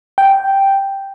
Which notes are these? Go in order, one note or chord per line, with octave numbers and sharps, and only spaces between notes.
G5